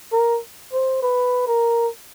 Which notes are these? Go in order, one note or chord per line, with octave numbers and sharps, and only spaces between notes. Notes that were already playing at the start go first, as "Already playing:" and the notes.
A#4
C5
B4
A#4